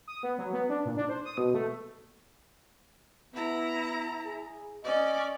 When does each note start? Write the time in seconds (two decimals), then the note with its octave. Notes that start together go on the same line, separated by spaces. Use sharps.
0.07 D#6
0.23 B3
0.38 F#3
0.53 B3
0.69 D4
0.85 A#2
0.97 D4
1.09 C5
1.25 D#6
1.37 B2
1.54 A3
3.34 B3 E4 A#5
4.25 G#4
4.84 C#4 D5 D#5